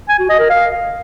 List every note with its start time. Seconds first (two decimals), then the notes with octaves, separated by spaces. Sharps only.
0.09 G#5
0.19 F#4
0.29 D#5
0.39 A#4
0.50 F5